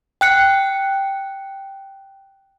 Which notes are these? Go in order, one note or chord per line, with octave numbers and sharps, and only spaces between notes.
G5 F#6 C#7